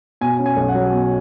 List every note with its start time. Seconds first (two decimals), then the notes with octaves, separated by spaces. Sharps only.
0.21 B2 G#5
0.39 C#4
0.46 G#5
0.57 B1
0.68 F#5
0.75 F#3
0.93 B2